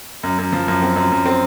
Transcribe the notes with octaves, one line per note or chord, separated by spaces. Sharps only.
F#2
F#2
F3
F#2
C4
F#2
F#2
C4